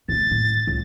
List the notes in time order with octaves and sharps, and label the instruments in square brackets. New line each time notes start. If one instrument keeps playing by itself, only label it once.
[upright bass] D2 B2 [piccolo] A6
[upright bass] A2
C#2